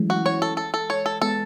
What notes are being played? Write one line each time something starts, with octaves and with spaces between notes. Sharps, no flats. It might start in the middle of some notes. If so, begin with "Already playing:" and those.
Already playing: E3 F#3 G#3 A3 C#4 E4
F#4
C#5
A4
A4
A4
C#5
A4
G#3 B3 A4